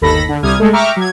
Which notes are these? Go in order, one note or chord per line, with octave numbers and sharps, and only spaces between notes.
G1 D#2 A4 B5 A#6
D3
C2 C3 G3 D#6 F6 G#6
G#3 A3 A4
E5 G5 A#5 C#6 D6 F6
F#3 G#6